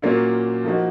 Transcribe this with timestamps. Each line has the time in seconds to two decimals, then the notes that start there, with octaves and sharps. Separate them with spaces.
0.02 A#2 F#3 A#3 C#4 F4
0.64 F3 A#3 D#4 F#4